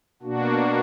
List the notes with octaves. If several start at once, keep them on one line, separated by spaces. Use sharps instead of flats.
B2 A#3 D4 F#4